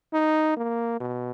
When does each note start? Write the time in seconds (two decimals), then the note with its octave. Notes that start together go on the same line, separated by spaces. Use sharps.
0.13 D#4
0.57 A#3
1.00 B2